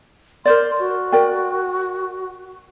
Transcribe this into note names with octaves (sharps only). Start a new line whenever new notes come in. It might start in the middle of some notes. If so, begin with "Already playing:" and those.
A#4 C5 D5 C6
F#4
A#4 D5 G5